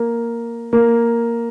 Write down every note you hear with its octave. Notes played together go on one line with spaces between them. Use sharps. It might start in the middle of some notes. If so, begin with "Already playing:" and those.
Already playing: A#3
A#3